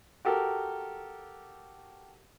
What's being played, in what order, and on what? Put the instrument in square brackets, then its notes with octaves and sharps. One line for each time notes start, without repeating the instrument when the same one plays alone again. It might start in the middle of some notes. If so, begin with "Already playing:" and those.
[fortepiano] F#4 G4 A4 A#4